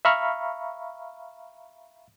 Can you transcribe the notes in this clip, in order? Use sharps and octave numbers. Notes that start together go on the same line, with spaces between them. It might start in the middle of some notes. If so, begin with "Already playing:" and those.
E5 F5 A#5 B5 C#6 F6